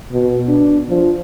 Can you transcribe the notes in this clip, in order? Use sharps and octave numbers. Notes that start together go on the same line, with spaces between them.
B2
D4
F3